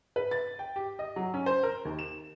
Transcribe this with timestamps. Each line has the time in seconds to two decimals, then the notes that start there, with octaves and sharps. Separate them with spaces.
0.16 B4
0.31 A6
0.59 G5
0.76 G4
0.99 D#5
1.16 F#3
1.34 C#4
1.46 C5
1.63 A#4
1.85 D#2
1.99 E7